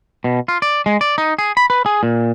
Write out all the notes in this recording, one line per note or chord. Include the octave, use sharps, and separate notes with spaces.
B2
F4
D5
G#3
D5
D#4
G#4
B5
B4
G#4
A#2